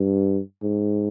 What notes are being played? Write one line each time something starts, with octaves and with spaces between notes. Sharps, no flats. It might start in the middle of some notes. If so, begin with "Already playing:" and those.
Already playing: G2
G#2